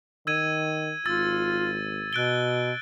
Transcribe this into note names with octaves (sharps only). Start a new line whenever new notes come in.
D#3 E6 G#6 D#7
G#1 F4 E6 A6
B2 F#6 D7 G7